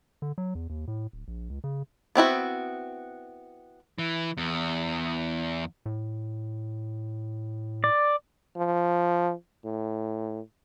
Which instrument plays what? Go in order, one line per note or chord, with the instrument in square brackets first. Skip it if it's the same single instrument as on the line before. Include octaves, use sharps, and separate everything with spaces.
[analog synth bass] D3
F#3
E2
D#2
A2
D1
A#1
C#2
C#3
[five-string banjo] B3 C4 E4 F#4
[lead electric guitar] E3
E2
[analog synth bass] A2
[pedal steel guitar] D5
[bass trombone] F3
A2